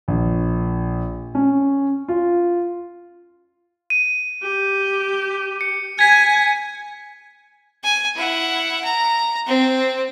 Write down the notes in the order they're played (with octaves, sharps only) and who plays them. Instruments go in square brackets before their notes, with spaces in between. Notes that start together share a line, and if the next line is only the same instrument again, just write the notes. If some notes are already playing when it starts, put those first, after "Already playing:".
[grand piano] A#1
C#4
F4
[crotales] D#7
[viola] G4
[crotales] C#7
[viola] G#5 [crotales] G#6 B6
[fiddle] G#5
E4 F#5
A#5
C4